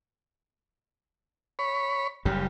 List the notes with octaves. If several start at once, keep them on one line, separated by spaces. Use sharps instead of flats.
C#5 B5
F#1 F#2 C#3 G3